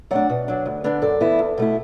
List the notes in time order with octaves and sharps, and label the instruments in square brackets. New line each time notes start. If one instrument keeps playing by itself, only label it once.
[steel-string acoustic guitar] F#3 A3 D4 D5 F#5
B2
F#3 D4
D2
D3 B3 D4
F#2 A4 D5
E3 B3 E4
E2
B2 A3 E4